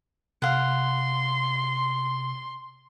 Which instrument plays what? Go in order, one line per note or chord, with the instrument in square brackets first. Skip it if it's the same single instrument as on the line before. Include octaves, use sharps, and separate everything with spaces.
[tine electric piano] C3 [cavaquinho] F5 F#5 [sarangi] C6